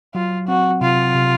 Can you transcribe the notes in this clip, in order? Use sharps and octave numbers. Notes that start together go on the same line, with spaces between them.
F#3 F4
C4 F#4
C3 F4
C3